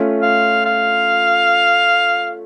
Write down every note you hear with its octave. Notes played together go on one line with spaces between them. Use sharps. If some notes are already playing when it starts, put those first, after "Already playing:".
Already playing: A3 C#4 F4
F5
F5